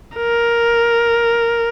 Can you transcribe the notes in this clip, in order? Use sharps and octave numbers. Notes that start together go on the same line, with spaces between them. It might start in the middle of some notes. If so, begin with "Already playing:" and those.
A#4